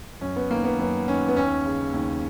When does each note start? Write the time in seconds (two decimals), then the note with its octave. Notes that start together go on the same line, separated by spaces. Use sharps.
0.21 F#2 C#4
0.36 B3
0.50 D#3 A#3
0.64 B3
0.79 F#2 B3
1.08 D#3 C#4
1.28 B3
1.36 D#2 C#4
1.66 C#3
1.94 D#2